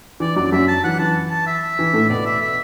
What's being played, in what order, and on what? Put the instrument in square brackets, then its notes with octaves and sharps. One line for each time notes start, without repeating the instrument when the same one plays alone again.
[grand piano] E3 [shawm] D5
[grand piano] F#2 F#3 [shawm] D5
[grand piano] F#2 F#3 [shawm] E5
[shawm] A5
[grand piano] E3 [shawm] F#5
[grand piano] E3 [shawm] A5
[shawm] A5
E5
[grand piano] E3
A2 A3
[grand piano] B2 B3 [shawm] D5
[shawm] E5
E5